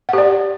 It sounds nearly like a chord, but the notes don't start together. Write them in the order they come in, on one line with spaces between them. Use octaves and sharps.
F#5 G4 D5